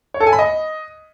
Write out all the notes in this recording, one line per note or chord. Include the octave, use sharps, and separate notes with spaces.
C#5
A4
G#5
B5
D#5